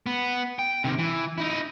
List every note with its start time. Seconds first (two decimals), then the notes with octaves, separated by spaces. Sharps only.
0.06 B3
0.59 G5
0.84 C3 D#3
0.98 E3
1.38 D#4 E4